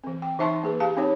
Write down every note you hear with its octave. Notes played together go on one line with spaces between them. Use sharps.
E3 C4
G5
E3 D#4 E5 A5 C6 C#6
A#3 G#4 B4
G4 F5 A5
C4 D#4 G4 C#5